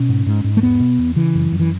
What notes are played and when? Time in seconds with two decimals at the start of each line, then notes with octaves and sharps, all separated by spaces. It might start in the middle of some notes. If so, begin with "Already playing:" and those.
Already playing: B2 C#4
0.09 G#2
0.26 G#2
0.44 G#2
0.57 A3
0.63 E2 B3
0.80 B2
0.98 E2
1.16 C#3 E3
1.35 F#2
1.52 F#2
1.60 E3